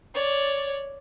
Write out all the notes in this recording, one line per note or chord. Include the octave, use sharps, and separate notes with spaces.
C#5 D5